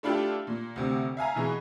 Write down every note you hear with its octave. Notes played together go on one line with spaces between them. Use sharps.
A3 D4 E4 F4 G4 A4
A#2
D2 C3
E5 F5 G#5 A#5
B2 E3 G#4